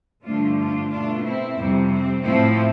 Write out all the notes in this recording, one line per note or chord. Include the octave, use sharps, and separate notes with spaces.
G2 D3 F3 A3 D4 F4
D4 F4
B2 A3 D4 F4
C4 E4
F2 C3 G3 C4
C4
A2 F3 A3 C4 E4